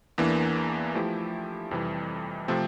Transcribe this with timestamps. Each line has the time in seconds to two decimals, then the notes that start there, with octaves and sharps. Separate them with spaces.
0.18 E2 E3 A#3 D4
0.95 F3 A3 E4 G4
1.71 F2 C3 E3 G3
2.48 C3 F3 A3 C4